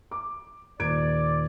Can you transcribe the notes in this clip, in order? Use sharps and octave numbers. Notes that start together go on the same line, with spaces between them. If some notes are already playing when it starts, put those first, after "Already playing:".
D6
D#1 D5 G#6 D7